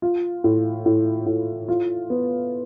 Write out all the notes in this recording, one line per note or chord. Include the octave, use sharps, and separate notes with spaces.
F4
A2
A2
A2
F4
B3